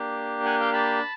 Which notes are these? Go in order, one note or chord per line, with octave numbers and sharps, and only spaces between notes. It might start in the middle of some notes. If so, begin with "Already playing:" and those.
Already playing: A#3 D4 G4
F#5 G#5
F5 G5
A5 B5